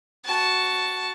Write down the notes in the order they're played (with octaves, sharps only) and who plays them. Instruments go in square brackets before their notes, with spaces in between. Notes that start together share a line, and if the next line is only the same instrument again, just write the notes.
[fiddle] F#4 A5